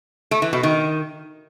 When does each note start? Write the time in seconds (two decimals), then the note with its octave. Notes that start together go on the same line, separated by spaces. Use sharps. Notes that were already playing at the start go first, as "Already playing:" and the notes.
0.31 A3
0.42 E3
0.53 B2
0.63 D#3